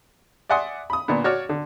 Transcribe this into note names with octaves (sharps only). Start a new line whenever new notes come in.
D5 E5 F#5 G#5 C6 D#6
B5 D#6
A#2 D3 B3
F#4 C#5 D5 F6
D3